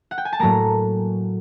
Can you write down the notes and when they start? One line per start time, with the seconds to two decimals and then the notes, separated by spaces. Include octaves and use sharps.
0.11 F#5
0.18 G5
0.25 G#5
0.33 A5
0.40 A2 F#3 A#3 A#5